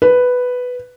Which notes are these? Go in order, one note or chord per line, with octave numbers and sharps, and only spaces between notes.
B4